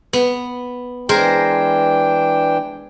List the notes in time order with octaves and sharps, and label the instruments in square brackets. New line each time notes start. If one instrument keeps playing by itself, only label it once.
[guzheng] B3
[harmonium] E3 D4 G5 [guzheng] G#3 A#4 C5